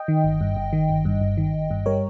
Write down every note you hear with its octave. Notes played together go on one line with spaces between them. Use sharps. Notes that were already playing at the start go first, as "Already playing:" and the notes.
Already playing: D#5 G5
D#3
G1
G2
G1
D#3
G1
G2
G1
D#3
G1
G2
G3 A#4 C#5